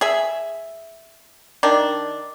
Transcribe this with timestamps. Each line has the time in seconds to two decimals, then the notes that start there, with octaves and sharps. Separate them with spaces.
0.01 G#4 E5
1.63 D#3 D4